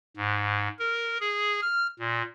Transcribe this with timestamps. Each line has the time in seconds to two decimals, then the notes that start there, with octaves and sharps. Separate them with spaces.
0.17 G#2
0.79 A#4
1.20 G#4
1.62 F6
1.99 A#2